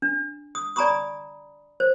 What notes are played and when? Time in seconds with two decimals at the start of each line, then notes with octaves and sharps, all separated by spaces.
0.02 D4
0.55 D#6
0.76 D5 G#5 A#5 B5 C#6 D#6
1.80 C5